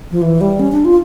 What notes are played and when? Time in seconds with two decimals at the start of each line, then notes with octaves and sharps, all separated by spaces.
0.11 F3
0.22 E3
0.41 G3
0.60 C#4
0.72 D4
0.85 F4